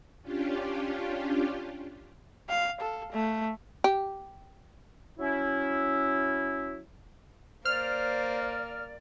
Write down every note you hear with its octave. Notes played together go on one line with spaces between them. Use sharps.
C#4 D4 F4 G4
F5
A4
A3
G4
F#3 C#4 E4
A#3 C5 D5 F6